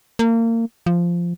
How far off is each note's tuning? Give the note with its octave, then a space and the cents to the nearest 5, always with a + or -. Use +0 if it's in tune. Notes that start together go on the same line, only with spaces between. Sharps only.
A#3 -30
F3 -10